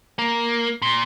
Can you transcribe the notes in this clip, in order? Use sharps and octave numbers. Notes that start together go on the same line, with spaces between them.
A#3
A#2